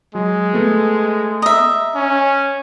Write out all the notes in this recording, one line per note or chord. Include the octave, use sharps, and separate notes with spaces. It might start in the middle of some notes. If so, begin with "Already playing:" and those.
F#3 G#3
A3 B3
D#5 E5 A#5
C#4